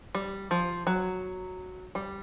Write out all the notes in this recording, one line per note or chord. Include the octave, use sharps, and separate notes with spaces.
G3
F3
F#3
G3